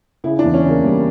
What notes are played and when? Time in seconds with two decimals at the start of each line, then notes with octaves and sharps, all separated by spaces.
0.24 C#3 E4
0.39 D4
0.44 E2
0.54 C#4
0.63 C#3
0.69 A#3
0.84 E2 G3